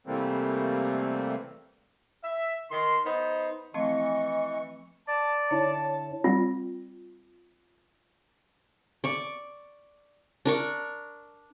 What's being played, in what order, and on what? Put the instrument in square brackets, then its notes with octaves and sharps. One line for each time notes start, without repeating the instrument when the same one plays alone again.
[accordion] C3 E3 G3 A3 A#3 C4
[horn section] E5
D#3 C6
B3 D#4 C5
[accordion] E3 C#6 [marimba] F3 A3 C4 [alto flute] D#5
[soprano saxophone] D5 [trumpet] A5
[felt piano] D3 E4 [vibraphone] C#5 [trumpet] A5
[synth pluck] G3 C4 [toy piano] F4
[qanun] D5 C#6
D4 A#4 C#6